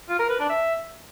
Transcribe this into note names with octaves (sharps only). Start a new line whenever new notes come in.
F4
A#4
B4
D4
E5